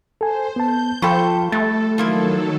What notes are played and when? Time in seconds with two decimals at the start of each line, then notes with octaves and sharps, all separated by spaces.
0.21 A4 C5 G#5
0.56 B3 A5 G6
1.02 F3 F4 A4 G5 B5 C#6
1.52 G3 A3 A4 A6
1.98 D#3 F3 F#3 A#3 E4 A4